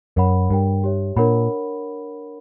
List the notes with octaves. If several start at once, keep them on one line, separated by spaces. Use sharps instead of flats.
F#2 A#4 C#5 F#5 B5
G2 G4 A#4 C#5 G5
G4 C#5 E5
A#2 D4 A#4 C#5 F#5 B5